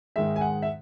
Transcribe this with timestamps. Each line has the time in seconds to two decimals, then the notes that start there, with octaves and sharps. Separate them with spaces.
0.16 G#2 D#3 G#3 E5
0.36 G#5
0.41 F#5
0.62 E5